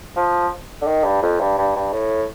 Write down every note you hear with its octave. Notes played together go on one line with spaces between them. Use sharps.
F3
D3
D#3
G2
F2
G2
G2
G2
A2